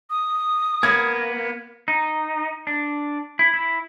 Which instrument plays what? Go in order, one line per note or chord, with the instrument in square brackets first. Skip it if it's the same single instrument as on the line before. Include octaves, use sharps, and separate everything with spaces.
[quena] D#6
[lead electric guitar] A#3 B3 [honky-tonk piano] G#6
[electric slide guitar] D#4
D4
E4
E4